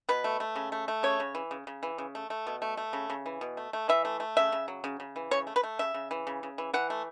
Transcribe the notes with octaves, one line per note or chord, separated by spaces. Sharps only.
B2 B4
A3
A3
C#3
A3
A3
C#3 C#5
C#3
E3
C#3
C#3
E3
C#3
A3
A3
B2
A3
A3
C#3
C#3
E3
B2
A3
A3
E3 E5
A3
A3
C#3 E5
C#3
F#3
C#3
C#3
E3
C#3 C#5
A3
B4
A3
C#3 E5
C#3
E3
C#3
C#3
E3
E3 F#5
A3